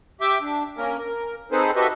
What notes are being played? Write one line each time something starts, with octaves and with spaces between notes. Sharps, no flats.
G4 E5 G5 D6
D4
A#3 C#4 A#4
A#4
C4 D#4 G#4 A4 B4 C5
F#4 G4 A4 B4 D#5 E5